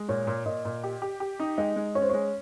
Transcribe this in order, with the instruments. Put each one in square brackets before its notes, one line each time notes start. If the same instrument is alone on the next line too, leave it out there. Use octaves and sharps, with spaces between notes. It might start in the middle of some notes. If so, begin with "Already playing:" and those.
Already playing: [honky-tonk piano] G#3
[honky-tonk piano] A#2 [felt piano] C#5
[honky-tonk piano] A#2
[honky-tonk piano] A#2 [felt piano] D#5
[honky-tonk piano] A#2
G4
G4
G4
D#4
[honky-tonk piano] G#3 [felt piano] D#5
[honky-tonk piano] G#3
[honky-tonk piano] C#4 [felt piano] C#5
[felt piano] C5
[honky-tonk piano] G#3 [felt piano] C#5